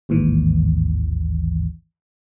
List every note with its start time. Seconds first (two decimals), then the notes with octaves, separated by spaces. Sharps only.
0.09 A1 D#2 G#2 E3